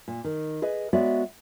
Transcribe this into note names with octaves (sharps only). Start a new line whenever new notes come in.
A#2
D#3
G#4 B4 D#5
G#3 B3 F#4 C#5 D5 E5